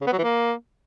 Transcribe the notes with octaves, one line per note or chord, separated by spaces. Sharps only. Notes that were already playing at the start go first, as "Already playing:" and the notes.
C#3
B3
F#3
E3
A#3